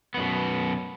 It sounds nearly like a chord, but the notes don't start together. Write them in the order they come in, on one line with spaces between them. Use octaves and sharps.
B3 F#2 B2